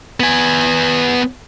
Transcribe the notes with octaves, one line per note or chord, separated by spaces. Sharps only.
B3 G#5